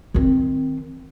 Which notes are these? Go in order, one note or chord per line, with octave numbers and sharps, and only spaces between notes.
D#3 C4